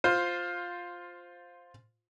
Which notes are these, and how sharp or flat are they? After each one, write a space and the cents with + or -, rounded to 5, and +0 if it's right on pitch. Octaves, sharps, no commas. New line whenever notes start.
F4 +10 C5 +0